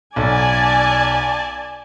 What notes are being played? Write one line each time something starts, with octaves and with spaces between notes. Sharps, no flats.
B1 D5 G#5 A5